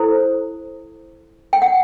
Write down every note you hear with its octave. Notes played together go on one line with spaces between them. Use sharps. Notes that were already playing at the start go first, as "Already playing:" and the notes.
Already playing: E4 A4 C5
G5
F#5